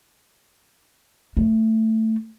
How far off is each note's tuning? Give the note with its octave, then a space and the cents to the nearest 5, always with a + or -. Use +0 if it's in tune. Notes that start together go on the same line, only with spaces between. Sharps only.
A3 +10